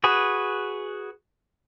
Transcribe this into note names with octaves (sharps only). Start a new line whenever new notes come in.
F#4 G#4 B4